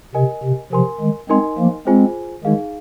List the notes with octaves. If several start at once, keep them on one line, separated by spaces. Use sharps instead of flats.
C3 A#4 D#5 G#5
C3
C3 F3 A#4 G#5 C6
D#3 G#3
G#3 C4 D#4 A#4 D#5 G#5 C6
F3 A#3
G#3 C4 F4 G#4 C5 G#5
D#3 G#3 D#4 G#4 F5